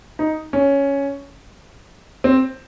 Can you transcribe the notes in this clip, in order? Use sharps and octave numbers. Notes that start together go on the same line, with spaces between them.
D#4
C#4
C4